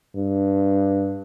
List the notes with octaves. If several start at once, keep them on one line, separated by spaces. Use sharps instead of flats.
G2